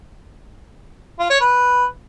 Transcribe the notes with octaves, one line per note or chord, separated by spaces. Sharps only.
F4
C#5
B4